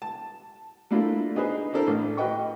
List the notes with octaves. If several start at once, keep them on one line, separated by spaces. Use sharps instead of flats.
A5
A3 A#3 D4 E4 F4 A4
D4 D#4 G#4 B4 C5 D#5
C4 D4 E4 A4 A#4 C5
A1
F#4 B4 D#5 G5 C#6